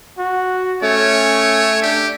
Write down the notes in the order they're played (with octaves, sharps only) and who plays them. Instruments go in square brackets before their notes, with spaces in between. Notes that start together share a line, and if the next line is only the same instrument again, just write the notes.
[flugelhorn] F#4
[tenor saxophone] A3 [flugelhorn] C#4 [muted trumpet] C#5
[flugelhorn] D4 [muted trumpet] G4